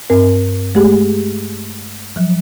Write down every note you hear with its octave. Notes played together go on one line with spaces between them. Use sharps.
G2 C4 A#4
G#3 A3 G4 G#4
F3 F#3